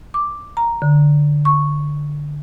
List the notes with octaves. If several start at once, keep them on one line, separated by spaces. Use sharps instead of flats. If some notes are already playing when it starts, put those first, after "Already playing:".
D6
A#5
D3
C#6